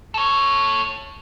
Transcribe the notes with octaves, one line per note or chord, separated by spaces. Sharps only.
A4 C#5